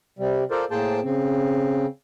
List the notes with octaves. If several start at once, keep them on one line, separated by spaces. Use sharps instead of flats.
C3 G3
F4 A4 A#4 C5 D5
A2 A#3 G#4 C5 G5 A5
C#3 C4